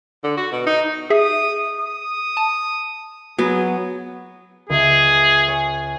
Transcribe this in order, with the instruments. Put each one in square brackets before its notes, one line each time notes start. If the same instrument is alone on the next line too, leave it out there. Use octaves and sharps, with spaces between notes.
[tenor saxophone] D3
F#4
B2
D#4
[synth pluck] G#4 E5 [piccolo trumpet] D#6
[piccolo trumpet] D#6
[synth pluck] A5
[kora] F#3 B3 [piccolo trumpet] G#4
[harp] C#2 E5 [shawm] G#4
[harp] C#5 G#5